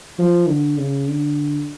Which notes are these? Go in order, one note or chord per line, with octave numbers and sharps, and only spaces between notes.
F3
D3
C#3
D3